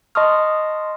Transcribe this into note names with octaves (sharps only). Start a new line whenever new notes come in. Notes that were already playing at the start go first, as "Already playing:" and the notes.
D#5 A5 C6 C#6 D#6 F6